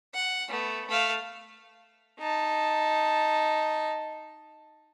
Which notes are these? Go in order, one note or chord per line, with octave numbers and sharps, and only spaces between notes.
F#5
A3 B3
A3 F5
D#4 A5